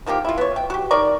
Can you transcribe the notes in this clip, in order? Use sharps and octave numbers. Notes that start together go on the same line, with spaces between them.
D#3 F3 A#3 G4
E4 F4
B3 C#5
G5
F#4 G4
D#3 A#4 D5 C#6